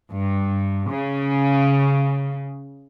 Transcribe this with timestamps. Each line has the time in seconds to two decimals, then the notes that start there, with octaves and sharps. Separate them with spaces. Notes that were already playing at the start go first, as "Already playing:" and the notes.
0.11 G2
0.90 C#3